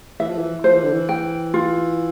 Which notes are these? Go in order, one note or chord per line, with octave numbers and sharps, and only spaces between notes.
E3 E5
F3
E3
F3 C5
E3
D3
E3
G5
F4